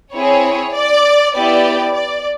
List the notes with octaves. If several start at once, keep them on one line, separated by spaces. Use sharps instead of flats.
C4 E4 G#4 C#5
D5
B3 E4 G4 D5
D5